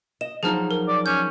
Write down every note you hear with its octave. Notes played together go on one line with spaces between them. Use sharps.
D#5 E7
F3 F#3 D#4 G#4 A5 F6
A#4
D5
C#4 G6